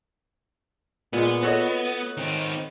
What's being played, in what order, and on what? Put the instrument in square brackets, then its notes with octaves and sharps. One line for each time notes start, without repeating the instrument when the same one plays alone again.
[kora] A#2 G#3 [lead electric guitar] B3
[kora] F#4 A4 [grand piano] B4 C#5 D#5
[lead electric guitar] D#3 C4